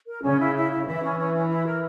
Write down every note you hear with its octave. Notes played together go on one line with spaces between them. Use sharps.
A#4
C#3 C#4
E4
E4
E4
E3 E5
C#4
C#4
C#4
E4
A#4